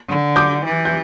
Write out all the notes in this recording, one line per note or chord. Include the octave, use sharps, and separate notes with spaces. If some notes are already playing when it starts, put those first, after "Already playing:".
D3
D6 G6
E3
G6